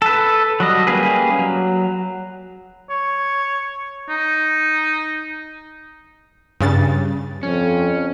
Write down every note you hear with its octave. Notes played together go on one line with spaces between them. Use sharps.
A4 B4
F#3 G3 D#5
G3 A#3 C#4 G#4 B4
F#3
C#5
D#4
G2 C#3 A6
F2 C#4